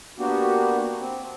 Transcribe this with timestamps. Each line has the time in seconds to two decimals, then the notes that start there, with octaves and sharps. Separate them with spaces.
0.19 A#3 B3 D4 F#4 G4
0.99 C4